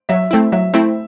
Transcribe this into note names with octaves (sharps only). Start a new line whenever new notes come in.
F#3 E5
A3 C4 E4
F#3 E5
A3 C4 E4